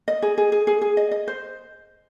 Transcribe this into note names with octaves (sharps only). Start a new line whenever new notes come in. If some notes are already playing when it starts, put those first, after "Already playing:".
D#5
G#4
G#4
G#4
G#4
G#4
D#5
D#5
C5